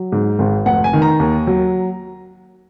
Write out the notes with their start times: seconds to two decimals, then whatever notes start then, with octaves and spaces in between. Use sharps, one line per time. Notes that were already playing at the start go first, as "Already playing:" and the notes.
Already playing: F#3
0.12 G#2
0.39 G#1
0.66 F1 F#5
0.84 G#5
0.93 D#3
1.02 A#5
1.20 D#2
1.47 F#3